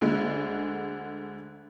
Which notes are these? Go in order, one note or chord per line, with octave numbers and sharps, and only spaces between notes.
D2 D3 G#3